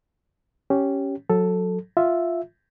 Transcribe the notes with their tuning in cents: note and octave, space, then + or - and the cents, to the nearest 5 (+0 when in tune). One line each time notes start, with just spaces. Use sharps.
C#4 +0 G4 -10
F#3 -25 A4 +0
F4 +0 E5 +0